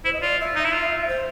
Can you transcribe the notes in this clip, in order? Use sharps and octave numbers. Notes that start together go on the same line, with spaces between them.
E4 C5
D#5
F4 D5
E5
D#4
E4
F4
C5